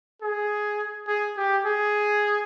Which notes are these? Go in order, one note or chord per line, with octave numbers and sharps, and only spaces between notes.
G#4
G#4
G4
G#4